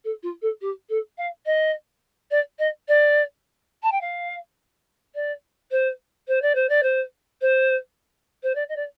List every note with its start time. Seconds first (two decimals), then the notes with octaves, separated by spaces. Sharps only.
0.04 A4
0.23 F4
0.42 A4
0.61 G4
0.89 A4
1.18 F5
1.46 D#5
2.31 D5
2.59 D#5
2.88 D5
3.83 A5
3.92 G5
4.01 F5
5.15 D5
5.71 C5
6.28 C5
6.42 D5
6.55 C5
6.69 D5
6.83 C5
7.41 C5
8.43 C5
8.55 D5
8.69 D#5
8.76 D5